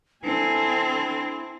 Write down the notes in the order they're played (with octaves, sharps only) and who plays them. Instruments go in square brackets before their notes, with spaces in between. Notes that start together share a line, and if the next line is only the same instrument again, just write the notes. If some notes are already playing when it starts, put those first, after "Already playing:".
[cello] C4 [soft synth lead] D4 [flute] E4 [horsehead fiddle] A4 G#5